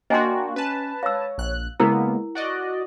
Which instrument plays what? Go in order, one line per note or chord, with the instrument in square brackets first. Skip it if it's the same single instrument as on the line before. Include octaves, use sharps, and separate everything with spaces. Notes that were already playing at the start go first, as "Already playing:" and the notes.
[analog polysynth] A#3 D4 F#4 [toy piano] D#5 G#5 C6 [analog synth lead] G5
[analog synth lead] C#4 [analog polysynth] B4 A5
[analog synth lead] C#5 [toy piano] F5 E6
[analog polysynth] A#1 F#6
[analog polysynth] C#3 A#3 B3 [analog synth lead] G#3 [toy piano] E4 A#4
[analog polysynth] F#4 D5 D#5 [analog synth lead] F#6